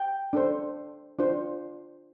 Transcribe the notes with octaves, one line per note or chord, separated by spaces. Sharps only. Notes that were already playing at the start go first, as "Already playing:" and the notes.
Already playing: G5
D4 A4 C5
D4 F4 C5